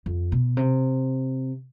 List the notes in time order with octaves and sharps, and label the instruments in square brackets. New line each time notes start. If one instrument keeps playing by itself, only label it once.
[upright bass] F2
B2
C3